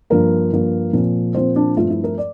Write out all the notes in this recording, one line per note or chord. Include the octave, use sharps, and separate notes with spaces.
G2 F3 A#3 A#4
G2 F3 A#3
A#2 F3 C4
A#2 F3 C4 C5
D4
G2 F3 A3 C4 F4
E4
A#4
D5